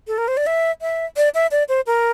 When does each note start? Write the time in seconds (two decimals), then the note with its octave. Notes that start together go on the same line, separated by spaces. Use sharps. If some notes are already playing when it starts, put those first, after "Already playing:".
0.07 A4
0.18 A#4
0.28 C5
0.37 D5
0.46 E5
0.81 E5
1.17 D5
1.34 E5
1.51 D5
1.69 C5
1.87 A#4